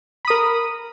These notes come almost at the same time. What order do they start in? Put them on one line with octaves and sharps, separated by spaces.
B5 D#6 A#4